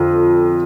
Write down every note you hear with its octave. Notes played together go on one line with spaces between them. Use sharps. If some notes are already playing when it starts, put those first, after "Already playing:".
Already playing: F2 D3